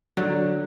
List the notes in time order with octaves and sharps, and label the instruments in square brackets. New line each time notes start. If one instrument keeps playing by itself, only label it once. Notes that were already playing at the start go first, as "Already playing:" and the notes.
[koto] D3 [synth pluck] F#3